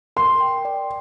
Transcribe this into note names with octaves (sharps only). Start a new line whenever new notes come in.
A#4 C6
G5
D5